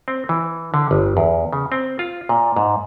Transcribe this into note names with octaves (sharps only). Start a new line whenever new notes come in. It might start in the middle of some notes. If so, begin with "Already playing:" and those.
C4
E3
D3
G1
E2
C#3
C4
F4
A#2
G#2